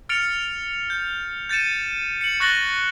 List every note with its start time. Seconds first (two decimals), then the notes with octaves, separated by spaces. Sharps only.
0.09 F6 A6 C#7 D7 F7
0.90 G6
1.49 G6 A6 C#7 D#7 E7
2.21 C#7 F#7
2.40 C#6 F#6 A6 A#6 F#7 G7